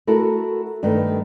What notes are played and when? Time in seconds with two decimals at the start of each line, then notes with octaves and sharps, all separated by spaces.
0.07 A3 E4 F#4 A4 A#4
0.83 G2 D#3 A3 B3